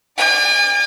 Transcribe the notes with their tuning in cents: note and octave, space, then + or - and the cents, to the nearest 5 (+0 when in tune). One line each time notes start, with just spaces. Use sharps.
D5 +20 G#5 -45